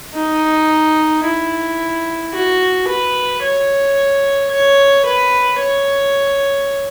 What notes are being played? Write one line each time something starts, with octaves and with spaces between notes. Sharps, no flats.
D#4
E4
F#4
B4
C#5
C#5
B4
C#5